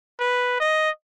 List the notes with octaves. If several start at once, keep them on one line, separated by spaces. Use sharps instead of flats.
B4
D#5